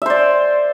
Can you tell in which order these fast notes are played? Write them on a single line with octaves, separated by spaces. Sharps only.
E5 C5 D5